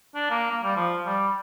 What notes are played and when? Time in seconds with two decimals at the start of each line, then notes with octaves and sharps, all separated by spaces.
0.15 D4
0.30 A#3
0.51 A#3
0.63 G3
0.76 F3
1.06 G3